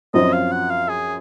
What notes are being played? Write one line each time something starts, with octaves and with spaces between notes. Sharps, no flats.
F#2 F3 C4 D#5
F5
F#5
F5
G#4